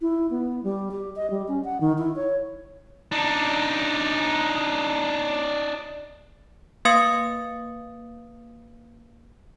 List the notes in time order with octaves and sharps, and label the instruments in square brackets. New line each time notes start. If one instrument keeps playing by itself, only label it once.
[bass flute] E4
B3
G3
G4
D#5
G3
C#4
F#5
D#3
E4
C#5
[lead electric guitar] D4 D#4
[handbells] A#3 B4 F5 D#6 A6 C#7